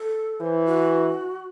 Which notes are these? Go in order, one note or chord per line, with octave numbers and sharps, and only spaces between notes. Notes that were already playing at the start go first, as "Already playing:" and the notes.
Already playing: A4
E3 C5
F#4